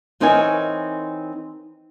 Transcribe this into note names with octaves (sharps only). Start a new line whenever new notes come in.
E3 C4 D#4 A#4 C#5 G#5